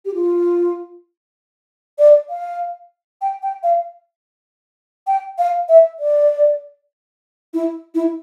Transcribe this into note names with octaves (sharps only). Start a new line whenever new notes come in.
G4
F4
D5
F5
G5
G5
F5
G5
F5
E5
D5
E4
E4